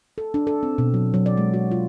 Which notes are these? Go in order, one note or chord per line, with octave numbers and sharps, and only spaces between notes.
A4
D4
A4
C4
B2
F#3
F#3
D5
G#3
F#4
F4